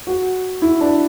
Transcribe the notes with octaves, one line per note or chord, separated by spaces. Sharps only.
F#4
E4
D4